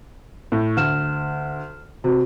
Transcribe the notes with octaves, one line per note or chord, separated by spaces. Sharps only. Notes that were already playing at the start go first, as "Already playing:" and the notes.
A2
D2 F6 E7
C3 F#4